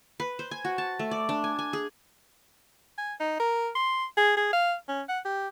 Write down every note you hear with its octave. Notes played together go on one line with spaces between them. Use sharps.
B4
C5
G#5
F#4
A5
A3
D5
D4
G#5
G#5
G#4
G#5
D#4
A#4
C6
G#4
G#4
F5
C#4
F#5
G4